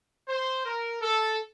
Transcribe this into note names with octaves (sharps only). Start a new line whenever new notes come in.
C5
A#4
A4